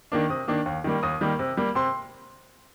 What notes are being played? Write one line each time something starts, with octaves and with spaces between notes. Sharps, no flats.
D#3 A#3 D4
C3 D#6
D#3 A#3 D4
D#2
D#3 G3 A#3
D#2 D#6
D#3 G3 A#3
C3
G3 A#3
C3 C6